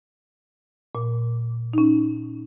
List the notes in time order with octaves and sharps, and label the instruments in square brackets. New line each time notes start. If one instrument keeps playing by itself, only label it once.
[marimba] A#2
C#4 D#4